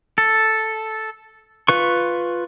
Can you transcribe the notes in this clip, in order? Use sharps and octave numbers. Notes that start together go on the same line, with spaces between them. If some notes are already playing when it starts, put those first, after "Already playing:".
A4
F4 B4 C#6